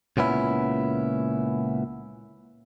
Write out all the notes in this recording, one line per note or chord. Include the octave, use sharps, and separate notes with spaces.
C#2 A#2 B3 C#4 E4